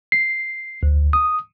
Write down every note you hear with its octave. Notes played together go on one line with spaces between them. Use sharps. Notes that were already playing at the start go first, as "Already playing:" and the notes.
C7
D2
D#6